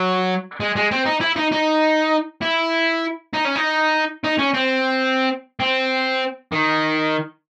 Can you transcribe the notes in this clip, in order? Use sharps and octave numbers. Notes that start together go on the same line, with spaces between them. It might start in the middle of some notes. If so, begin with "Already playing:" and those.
Already playing: F#3
G#3
G#3
C4
D#4
E4
D#4
D#4
E4
D#4
C#4
D#4
D#4
C#4
C4
C4
D#3